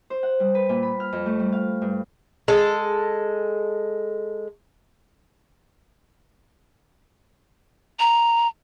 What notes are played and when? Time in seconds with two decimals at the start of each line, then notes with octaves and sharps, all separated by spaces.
0.10 C5
0.23 F#5
0.40 G3
0.55 B4
0.69 A#2
0.83 B5
1.00 F6
1.13 F2
1.26 A3
1.40 G3
1.52 F5
1.82 G2
2.48 G#3 A4
8.00 A#5